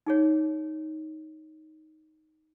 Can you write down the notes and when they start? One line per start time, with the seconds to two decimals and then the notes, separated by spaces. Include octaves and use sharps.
0.07 D#4 G#4 C#5